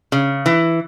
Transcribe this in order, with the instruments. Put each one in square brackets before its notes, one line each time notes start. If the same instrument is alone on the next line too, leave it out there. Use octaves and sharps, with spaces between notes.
[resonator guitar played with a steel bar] C#3
E3